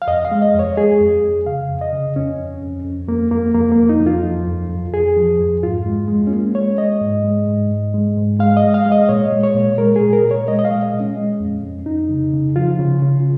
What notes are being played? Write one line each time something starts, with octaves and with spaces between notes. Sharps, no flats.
F5
F2 D#5
F5
G#3
D#5
F2 C#5
G#3 G#4
F2
F2
C#3 F5
F2
D#5
C#3
F2 C#4
F2
F2
F2
F2 A#3
F2 A#3
F2 A#3
A#3
F2
D#4
F2
F4
F3
F2
F2
F2 G#4
F3
F2
G#2 F4
G#3
G#3
C#4
G#3 A#3
G#3 C#5
G#3 D#5
G#2
G#3
G#2
G#2
G#3
G#2
G#3 F5
D#5
G#3
F5
G#3
D#5
A#2 C#5
G#3
C#5
A#2
G#3 A#4
G#4
A#2
A#4
A#2
C#5
G#3 D#5
D#5
F5
G#3
D#5
A#2
C#4
G#3
F2
F2
F2 D#4
C#3
C#3
F3 F4
C#3
C#3